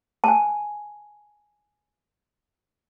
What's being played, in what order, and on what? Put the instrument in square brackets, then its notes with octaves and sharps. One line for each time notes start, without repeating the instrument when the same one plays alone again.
[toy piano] G#5 A5